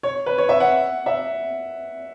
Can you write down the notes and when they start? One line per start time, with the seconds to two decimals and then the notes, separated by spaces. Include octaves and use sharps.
0.03 C#5
0.26 B4
0.38 C#5
0.49 E5
0.60 F#5
1.06 E5